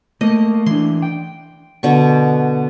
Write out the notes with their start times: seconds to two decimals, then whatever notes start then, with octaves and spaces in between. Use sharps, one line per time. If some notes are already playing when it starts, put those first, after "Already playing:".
0.21 A3 A#3 D#5
0.66 E3 D4 C6
1.02 G5
1.83 B2 D3 B3 C#6